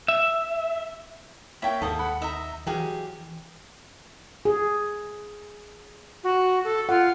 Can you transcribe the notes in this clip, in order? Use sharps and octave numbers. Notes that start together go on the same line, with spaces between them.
E5
A#3 E4 C#5 E5 G5
D#2 G#2 A4 D#6
F#5 B5
D#4 E5 A#5
E3 F#3 G4 G#4 F5
G#4
F#4
A4
F4 F#5